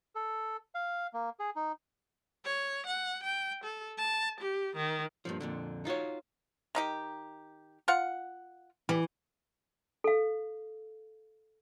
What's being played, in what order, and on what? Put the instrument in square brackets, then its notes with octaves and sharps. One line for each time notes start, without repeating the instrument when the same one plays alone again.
[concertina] A4
F5
A#3
G#4
D#4
[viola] C#5
F#5
G5
A4
A5
G4
D#3
[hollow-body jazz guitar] G2 A#2 F3
F2 A#2 D3
D#4 F4 F#4 C#5
[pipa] D#3 D#4 G4
F4 F5 F#5
[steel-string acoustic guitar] E3 [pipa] G3
[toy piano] A4 F5